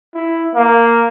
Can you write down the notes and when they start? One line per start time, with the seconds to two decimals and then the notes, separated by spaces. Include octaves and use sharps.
0.15 E4
0.55 A#3